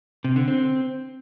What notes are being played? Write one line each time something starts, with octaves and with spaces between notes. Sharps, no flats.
C3
D3
C4